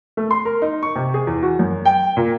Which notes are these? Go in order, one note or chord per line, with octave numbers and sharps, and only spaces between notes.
A3
C6
A#4
D#4
C#6
C3
G#4
E2
F#4
F#2
G5
A#2